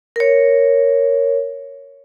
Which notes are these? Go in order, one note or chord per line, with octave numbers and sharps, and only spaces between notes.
A#4 C#5